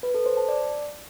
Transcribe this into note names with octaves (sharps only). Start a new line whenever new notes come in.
B4
A4
C5
A5
D5